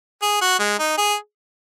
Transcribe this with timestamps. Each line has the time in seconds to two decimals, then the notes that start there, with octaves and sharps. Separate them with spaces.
0.22 G#4
0.41 F#4
0.59 G#3
0.79 D#4
0.98 G#4